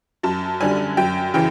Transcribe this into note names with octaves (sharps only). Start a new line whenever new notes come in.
F#2 A5
D3 G3 G#5
F#2 G5
C#3 E3 G5